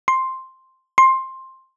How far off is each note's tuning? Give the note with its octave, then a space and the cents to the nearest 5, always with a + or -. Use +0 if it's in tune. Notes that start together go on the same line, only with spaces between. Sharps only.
C6 +0
C6 +10